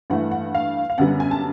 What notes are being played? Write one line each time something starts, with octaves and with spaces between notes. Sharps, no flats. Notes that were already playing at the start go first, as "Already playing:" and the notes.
G2 E3 A3 F#5
F#5
F5
F5
F#2 D3 G3 B3 F#5
G#5
A5